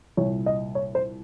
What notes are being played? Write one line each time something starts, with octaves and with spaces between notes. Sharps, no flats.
C2 A#2 C#5
D#5
C#5
C5